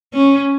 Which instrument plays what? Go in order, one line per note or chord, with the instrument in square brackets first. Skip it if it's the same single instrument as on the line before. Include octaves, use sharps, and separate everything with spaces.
[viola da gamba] C#4